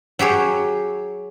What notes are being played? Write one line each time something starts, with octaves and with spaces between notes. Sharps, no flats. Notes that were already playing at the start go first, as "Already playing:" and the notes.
F#3 G4 G#4 C#5